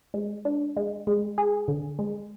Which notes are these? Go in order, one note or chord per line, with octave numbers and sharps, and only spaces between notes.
G#3
D4
G#3
G#3
G#4
D3
G#3